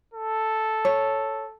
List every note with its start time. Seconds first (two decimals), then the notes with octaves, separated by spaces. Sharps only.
0.14 A4
0.85 C#5